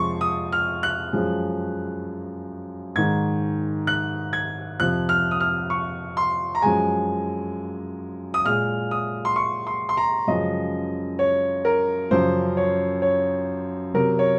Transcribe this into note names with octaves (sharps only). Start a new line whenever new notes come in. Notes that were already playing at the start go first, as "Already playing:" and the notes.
Already playing: F2 C3 F3 G#3 C6 C#6
D#6
F6
F#6
F#2 F3 G#3
G#2 D#3 G#3 G#6
F#6
G#6
F2 C3 F3 F#6
F6
D#6
F6
C#6
C6
A#5
F#2 F3 G#3 G#5
D#6
A#2 G#3 F6
D#6
C6
C#6
C6
C6
A#5
F#2 C#3 F3 G#3 D#5
C#5
A#4
F#2 C#3 F3 C5
C#5
C#5
C3 F#3 A#4
C#5